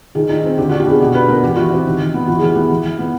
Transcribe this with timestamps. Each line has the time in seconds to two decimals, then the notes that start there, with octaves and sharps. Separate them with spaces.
0.15 D#3 G#4
0.29 D#4
0.44 C4
0.58 D3 G4
0.69 D4 F#4
0.80 G4
0.86 B3 G#4
1.00 B2 G4
1.15 D4 B4
1.28 B3 A#4
1.43 E3 G4
1.56 E3 F#4
1.70 C4 G4
1.85 D#3
1.99 D#3
2.14 B3
2.27 E3 F#4
2.39 E3 G#4
2.49 G4
2.55 B3
2.70 E3
2.85 E3
2.99 B3